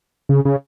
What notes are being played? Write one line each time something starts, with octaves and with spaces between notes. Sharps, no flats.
C#3
C#3